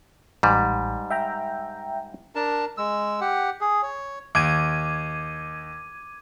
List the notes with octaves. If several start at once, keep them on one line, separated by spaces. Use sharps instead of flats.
A1 G#2 G3
E5 G5 A#5
D4 A#4 A5
G#3 E6
G4 F#5
G#4
C#5
D#2 D6 G#6 D#7